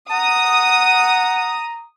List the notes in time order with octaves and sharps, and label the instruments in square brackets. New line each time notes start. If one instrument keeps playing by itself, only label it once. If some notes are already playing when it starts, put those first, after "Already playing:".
[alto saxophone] F#5 [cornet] A#5 [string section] D#6